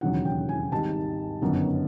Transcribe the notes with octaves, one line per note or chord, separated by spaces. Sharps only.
E1 D#2 C#3 F#3 F#5
G5
G#5
G#1 G#2 D#3 G3 A5
G1 F#2 D#3 F#3 B3